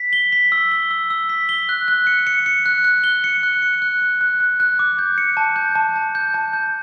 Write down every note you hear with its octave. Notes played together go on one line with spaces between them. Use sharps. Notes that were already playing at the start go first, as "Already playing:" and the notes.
Already playing: B6
G7
B6
E6
G7
E6
E6
B6
G7
F#6
F#6
C#7
C#7
C#7
F#6
F#6
G7
C#7
F#6
C#7
F#6
F#6
F#6
F#6
F#6
D6
G6
C#7
A5
G6
A5
A5
G6
A5
G6